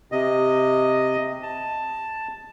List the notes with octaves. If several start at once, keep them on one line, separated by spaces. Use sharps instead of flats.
C3 D#5
A5